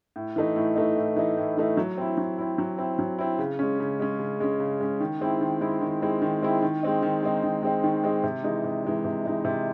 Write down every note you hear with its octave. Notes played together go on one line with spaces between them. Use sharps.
A2
E3 A3 D#4
A2
E3 A3 D#4
A2
E3 A3 D#4
A2
E3 A3 D#4
F#3
C4 E4
F#3
C4 E4
F#3
C4 E4
F#3
C4 E4
C#3
G#3 C#4
C#3
G#3 C#4
C#3
G#3 C#4
C#3
G#3 C#4
D#3
G#3 C4 E4
D#3
G#3 C4 E4
D#3
G#3 C4 E4
D#3
G#3 C4 E4
D#3
G#3 C4 D#4
D#3
G#3 C4 D#4
D#3
G#3 C4 D#4
D#3
G#3 C4 D#4
C3
E3 G#3 D#4
C3
E3 G#3 D#4
C3
E3 G#3 D#4
C3